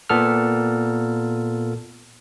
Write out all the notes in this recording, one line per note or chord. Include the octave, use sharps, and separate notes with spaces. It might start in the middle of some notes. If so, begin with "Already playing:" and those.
A#2 B3 A4 F6